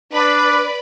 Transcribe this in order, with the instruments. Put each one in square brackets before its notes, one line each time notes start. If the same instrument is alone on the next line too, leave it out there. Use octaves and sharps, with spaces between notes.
[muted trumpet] D4 [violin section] B4 D5 B5